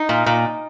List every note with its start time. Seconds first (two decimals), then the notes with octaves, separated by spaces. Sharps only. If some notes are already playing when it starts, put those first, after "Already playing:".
Already playing: D#4
0.09 A#2
0.26 A#2